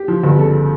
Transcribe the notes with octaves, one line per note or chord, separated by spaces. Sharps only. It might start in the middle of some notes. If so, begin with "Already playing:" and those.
Already playing: G4
F3
G1
C#3 A4